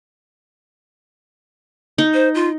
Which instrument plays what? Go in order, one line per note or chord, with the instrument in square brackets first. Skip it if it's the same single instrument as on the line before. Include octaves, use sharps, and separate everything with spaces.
[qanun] D#4
[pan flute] C5
F4